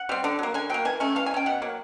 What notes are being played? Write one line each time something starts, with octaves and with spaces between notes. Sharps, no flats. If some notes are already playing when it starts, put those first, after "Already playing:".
Already playing: F#5
G3 C4
D3
F#3 A#3
D3 G#5
F#3 A#3 G5
E3 G#5
A3 C#4
E3 F5
G#5
A3
C#4 G5
B2 F#5
F#3 A#3